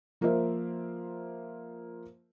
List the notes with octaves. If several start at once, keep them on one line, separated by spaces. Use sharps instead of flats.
F3 A#3 F4 A#4 C5 E5